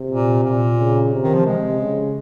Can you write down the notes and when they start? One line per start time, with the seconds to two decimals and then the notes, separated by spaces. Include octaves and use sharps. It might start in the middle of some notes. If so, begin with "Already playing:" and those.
Already playing: C3
0.11 A#2
0.44 A#2
0.78 C#3
1.12 C3
1.23 D#3
1.34 F3
1.46 C3 G#3
1.79 C#3